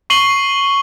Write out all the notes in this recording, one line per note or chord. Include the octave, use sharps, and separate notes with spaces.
C#6 C7 D#7 F#7 G7